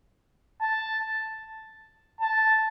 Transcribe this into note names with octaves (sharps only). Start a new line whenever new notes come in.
A5
A5